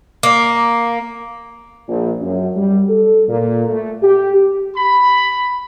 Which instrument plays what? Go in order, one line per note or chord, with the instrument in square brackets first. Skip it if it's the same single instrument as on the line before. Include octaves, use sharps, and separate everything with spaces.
[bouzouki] A#3
[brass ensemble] A#1
F#2
G3
A4
A#2
A3
G4
[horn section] B5